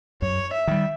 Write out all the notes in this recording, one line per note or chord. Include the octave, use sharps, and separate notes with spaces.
F#2 C#5
E5
D#3 G3